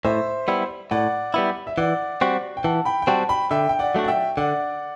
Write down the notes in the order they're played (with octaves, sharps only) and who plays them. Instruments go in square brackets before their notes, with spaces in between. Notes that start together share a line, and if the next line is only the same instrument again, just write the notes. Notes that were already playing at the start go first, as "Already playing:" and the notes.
[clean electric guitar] A2 [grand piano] C5 E5
[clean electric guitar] G3 B3 E4
[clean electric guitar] A2 [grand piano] D5 F#5
[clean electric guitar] G3 B3 E4
[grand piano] E5
[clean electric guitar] E3 [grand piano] D5 F#5
[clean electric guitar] G3 C4 F#4
[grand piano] G5
[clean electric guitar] E3 [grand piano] F#5 A5
[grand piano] G5 B5
G5
[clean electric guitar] G3 C4 F#4 [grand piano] F#5 A5
[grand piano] G5 B5
[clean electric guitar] D3 [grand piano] E5 G5
[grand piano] G5
D5 F#5
[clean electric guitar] F#3 A3 D4 F#4
[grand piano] F#5
E5 G5
[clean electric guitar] D3 [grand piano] D5 F#5